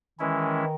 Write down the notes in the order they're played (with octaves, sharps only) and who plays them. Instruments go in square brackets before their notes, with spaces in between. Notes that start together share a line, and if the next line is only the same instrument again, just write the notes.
[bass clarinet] D#3 [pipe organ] E3 G#3 C#4 E4